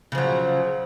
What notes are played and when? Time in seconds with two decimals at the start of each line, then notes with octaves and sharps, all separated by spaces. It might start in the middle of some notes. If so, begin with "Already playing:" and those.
0.12 C#3
0.15 F3
0.18 F#3